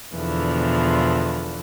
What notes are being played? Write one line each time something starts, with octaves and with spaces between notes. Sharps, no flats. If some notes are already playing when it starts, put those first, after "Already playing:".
E2 B2 D3 E3 F3